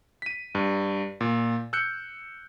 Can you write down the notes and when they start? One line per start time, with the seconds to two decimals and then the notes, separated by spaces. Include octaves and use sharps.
0.22 B6 D#7
0.55 G2
1.21 A#2
1.73 E6 F#6 G6 C#7